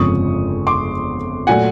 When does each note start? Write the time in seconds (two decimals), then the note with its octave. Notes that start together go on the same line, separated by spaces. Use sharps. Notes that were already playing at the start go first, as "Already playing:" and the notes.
Already playing: G1 F2 C#3 F3 G#3 C#6 D#6
0.67 C6 D6
1.47 A#2 F#3 A3 F#5 G#5